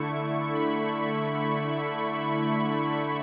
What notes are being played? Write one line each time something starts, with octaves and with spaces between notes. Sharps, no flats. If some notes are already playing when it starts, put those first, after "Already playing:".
Already playing: D3 A3 E4 C#6
B5